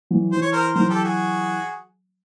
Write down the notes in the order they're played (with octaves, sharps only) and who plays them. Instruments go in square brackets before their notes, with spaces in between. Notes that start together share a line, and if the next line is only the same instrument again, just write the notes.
[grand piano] E3 F#3
[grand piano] E3 [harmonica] C5
[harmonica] C#5
A#4 C5
[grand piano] E3 F#3 [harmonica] A#4 C5
[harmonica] G4 A4
F#4 G#4